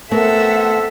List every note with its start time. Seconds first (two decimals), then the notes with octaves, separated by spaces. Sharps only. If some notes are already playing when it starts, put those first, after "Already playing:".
0.11 A3 B3 C4 A4 A#4 E5 F#5